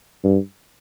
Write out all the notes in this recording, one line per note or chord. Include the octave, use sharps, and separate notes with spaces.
G2